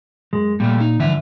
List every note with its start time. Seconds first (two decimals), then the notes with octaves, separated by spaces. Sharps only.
0.33 F#2 G#3
0.60 A#2 G3 A3
0.80 D#4
1.00 G2 D3 E3 F3 E5